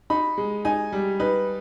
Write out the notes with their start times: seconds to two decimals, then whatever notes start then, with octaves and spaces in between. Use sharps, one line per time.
0.10 D#4 B5
0.38 G#3
0.65 D#4 G#5
0.92 G3
1.20 D#4 B4